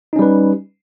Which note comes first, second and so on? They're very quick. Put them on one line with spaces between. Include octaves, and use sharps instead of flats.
D#4 C#4 G3 B4